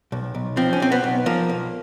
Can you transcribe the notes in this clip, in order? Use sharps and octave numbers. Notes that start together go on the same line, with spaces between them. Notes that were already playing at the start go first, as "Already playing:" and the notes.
B1
B1
F3 C4
C#4
B1 C4
B3
B1
F3 A#3
B1